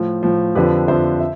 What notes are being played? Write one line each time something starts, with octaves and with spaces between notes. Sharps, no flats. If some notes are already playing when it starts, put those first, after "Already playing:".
Already playing: A2 F3
A2 F3
F2 D3 F3 G4 B4
F2 D3 F3 C5 E5
E5